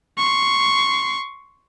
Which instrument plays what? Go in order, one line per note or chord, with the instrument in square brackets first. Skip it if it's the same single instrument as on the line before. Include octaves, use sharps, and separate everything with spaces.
[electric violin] C6 C#6